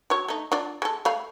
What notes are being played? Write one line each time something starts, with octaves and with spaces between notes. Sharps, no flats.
F#3 C#5
A3 D#4
D4 F4 D5
G#3 A4
A3 F5 B5